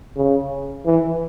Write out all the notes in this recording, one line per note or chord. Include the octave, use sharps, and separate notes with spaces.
C#3
E3